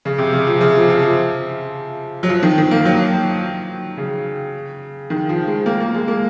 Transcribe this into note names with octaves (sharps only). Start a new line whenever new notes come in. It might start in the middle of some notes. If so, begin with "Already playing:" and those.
C#3
C3
C#3
F3
C#3
F3
F3
F3
F#3
F3
D#3
D#3
A#3
F#3
C#3
D#3
F3
G#3
A#3
A#3
G#3
A#3